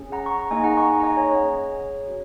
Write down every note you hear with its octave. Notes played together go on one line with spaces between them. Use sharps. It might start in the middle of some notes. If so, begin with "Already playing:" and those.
Already playing: C#4 G#4
F#5 A#5
C#6
A#5
A#3 D#4 G#4 D#5 G#5
F#5 A#5
G#5 C#6
A#5
D#5 G#5
C#5 F#5
C#4 G#4 C#5
C#4 F#4